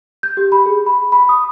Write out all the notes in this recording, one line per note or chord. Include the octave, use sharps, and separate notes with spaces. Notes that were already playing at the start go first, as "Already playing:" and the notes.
G6
G4
B5
G#4
B5
B5
D#6